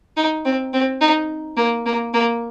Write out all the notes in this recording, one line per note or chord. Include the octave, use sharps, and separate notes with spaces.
D#4
C4
C4
D#4
A#3
A#3
A#3